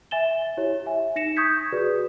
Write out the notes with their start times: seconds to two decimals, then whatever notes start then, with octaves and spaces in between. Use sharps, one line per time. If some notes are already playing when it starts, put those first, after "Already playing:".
0.11 E5 G#5 A6 E7 G7
0.57 E4 G4 C#5
0.86 E5 G#5
1.16 D#4 A#6 C#7 E7
1.36 C#6 D#6 G6 G#6 B6
1.72 F#4 G#4 B4 D5